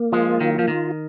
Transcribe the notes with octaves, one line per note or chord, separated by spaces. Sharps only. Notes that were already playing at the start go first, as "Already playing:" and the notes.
Already playing: A#3
F3 G#3 F4
D#3 F#3
F3 F4
D#3